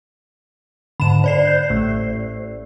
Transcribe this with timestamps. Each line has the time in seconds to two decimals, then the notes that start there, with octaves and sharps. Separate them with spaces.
1.00 G#2 D3 B5 E7
1.24 C5 D5 C7
1.45 F#6 G6
1.70 A1 A2 A3